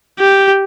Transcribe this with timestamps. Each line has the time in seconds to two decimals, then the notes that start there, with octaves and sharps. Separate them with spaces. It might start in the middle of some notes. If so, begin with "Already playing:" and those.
0.20 G4